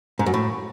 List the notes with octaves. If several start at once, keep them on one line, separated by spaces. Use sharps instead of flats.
G#2
F#2
A2